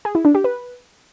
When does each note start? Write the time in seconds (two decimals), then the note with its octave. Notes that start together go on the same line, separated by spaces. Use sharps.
0.05 G#4
0.15 E4
0.25 D4
0.35 G4
0.44 B4